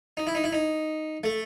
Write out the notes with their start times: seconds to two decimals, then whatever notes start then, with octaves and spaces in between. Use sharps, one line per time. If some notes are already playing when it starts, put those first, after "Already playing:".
0.17 D#4
0.27 E4
0.35 D#4
0.44 E4
0.53 D#4
1.24 A3